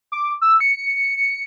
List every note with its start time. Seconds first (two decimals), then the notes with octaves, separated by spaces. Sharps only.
0.12 D6
0.42 E6
0.60 C#7